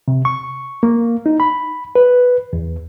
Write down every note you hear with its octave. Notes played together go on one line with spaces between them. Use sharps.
C3
C#6
A#3
D#4
B5
B4
E2